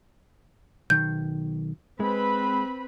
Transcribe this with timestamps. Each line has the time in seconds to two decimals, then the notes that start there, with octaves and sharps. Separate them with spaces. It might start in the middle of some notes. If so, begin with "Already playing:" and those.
0.90 B1 D#3 G6
2.00 G#3 C4 B4 B5